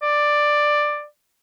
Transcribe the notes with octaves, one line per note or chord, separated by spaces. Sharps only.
D5